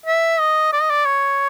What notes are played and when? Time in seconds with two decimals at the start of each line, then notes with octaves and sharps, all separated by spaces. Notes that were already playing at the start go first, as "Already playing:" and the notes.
0.06 E5
0.40 D#5
0.73 D5
0.82 D#5
0.90 D5
1.06 C#5